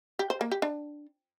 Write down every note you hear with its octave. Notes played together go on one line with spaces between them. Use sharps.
G4
C5
A#3
G4
D4